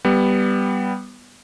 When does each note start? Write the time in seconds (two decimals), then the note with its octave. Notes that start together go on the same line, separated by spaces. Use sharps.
0.05 G3 B3